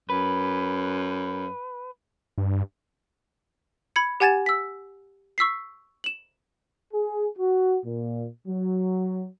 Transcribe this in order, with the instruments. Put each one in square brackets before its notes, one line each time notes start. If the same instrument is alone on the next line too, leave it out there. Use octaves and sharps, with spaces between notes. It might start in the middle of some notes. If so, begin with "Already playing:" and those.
[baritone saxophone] F#2 [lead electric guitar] B4
[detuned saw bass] G2
[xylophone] B5 G#6 C#7
G4 F#5 G#5 G#6 A6 E7
E6 B6
C#6 E6 B6 C7
E7 F#7
[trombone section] G#4
F#4
A#2
F#3